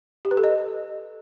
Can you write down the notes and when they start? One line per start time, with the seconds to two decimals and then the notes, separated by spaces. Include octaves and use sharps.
0.25 G4
0.31 B4
0.37 A4
0.44 D#5